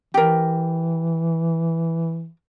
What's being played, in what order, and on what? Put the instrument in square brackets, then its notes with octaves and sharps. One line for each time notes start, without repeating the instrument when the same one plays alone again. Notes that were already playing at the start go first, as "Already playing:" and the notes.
[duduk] E3 [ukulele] G4 A#4